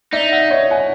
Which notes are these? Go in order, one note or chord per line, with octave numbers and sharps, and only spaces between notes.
D#4 D5 E5
E5 F#5
C#5 D#5
F#5 G#5